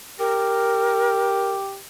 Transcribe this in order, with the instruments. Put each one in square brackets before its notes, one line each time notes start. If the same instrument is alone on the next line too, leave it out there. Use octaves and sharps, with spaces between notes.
[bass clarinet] G4 [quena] A#4